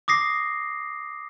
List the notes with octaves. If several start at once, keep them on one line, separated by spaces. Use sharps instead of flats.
D6 D#6 A#6 C7